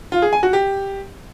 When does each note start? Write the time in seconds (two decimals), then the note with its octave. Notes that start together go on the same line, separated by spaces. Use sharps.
0.12 F4
0.22 G#4
0.33 G#5
0.43 F#4
0.53 G4